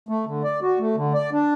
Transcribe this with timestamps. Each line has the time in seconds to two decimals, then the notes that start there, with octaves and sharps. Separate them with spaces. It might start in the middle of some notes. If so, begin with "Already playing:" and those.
0.09 A3
0.26 D3
0.44 D5
0.62 F#4
0.80 A3
0.97 D3
1.14 D5
1.33 D4